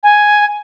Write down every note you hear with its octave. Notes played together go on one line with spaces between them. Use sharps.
G#5